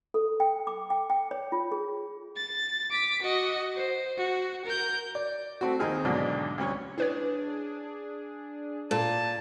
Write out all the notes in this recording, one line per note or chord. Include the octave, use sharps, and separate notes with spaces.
A4
G5
D6
G5
G5
C#5
F4
G#4
A6
D6 B6
F#4 D#5
C5
F#4
A#4 G6
D5
A3 C4 F#4
D#2 C4 D#4 G#4 F6
B1 G#2 D3 F#3 A#3 D4
D2 G3 C#4 C#5 C#6
D4 E4 G#4 B4 C#5
A#2 A4 A5